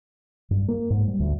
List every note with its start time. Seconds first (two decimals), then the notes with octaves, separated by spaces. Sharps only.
0.51 G2
0.68 A#3
0.90 G#2
1.08 G3
1.19 D2